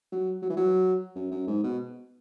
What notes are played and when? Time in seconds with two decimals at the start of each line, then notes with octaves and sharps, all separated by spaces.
0.12 F#3
0.42 F#3
0.49 E3
0.56 F#3
1.15 F#2
1.31 F#2
1.47 G#2
1.64 B2